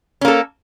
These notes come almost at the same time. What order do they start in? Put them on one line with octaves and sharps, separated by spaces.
C#4 A#3 A4